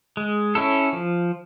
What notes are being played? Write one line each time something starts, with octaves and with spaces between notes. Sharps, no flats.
G#3
C#4 E4 A4
F3